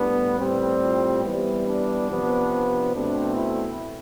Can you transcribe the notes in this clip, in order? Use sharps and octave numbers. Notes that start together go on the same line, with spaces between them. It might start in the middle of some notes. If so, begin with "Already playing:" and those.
Already playing: A2 G3 B3 D4
A2 G3 C4
F4
E3 G3 B3 E4
D4
C3 F3 B3
B2 A3 C4 D4
E4